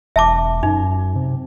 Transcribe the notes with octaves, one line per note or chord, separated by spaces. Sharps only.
E1 E5 A5 D6
F#2 D#4
C3